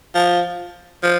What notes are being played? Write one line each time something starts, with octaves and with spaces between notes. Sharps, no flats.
F3
F3